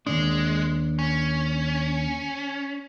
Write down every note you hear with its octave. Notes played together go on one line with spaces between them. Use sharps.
D#2 G#2 G#3 D4
C#4